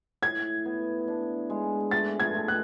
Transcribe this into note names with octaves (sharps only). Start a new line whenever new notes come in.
A2 G#6
B3
D4
G#3
A3 A6
G#6
A3
F#6